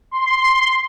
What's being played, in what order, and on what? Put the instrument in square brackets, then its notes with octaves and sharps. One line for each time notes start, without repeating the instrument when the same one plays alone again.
[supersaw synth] C6